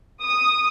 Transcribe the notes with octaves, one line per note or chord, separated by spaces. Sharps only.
D#6